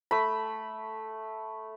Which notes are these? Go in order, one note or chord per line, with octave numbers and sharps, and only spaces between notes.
A3 B5